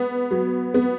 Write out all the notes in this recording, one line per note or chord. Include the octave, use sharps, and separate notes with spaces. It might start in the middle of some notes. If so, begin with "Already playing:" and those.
Already playing: B3
F#3
B3